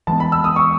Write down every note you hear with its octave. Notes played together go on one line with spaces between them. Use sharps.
E3 G#3 B3 A5
B5
E6
D#6
C#6